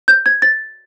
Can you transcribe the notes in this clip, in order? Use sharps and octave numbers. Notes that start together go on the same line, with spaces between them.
G6
G#6
A6